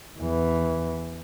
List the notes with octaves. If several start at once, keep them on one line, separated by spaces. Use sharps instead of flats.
E2 E3